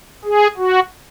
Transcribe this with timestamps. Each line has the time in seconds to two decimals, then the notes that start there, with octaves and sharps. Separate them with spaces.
0.25 G#4
0.57 F#4